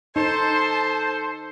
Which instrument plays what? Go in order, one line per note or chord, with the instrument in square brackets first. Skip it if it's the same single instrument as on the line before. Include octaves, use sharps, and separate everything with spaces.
[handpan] D#4 [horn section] A4 C5 [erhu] A5